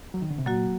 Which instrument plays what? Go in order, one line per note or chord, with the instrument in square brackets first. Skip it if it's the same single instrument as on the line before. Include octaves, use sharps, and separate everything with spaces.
[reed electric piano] F#3
D#3
D3
C3
[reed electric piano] A#2 [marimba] F#3 A#3 F#4